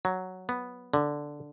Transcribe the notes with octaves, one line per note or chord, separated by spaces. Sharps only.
F#3
B3
D3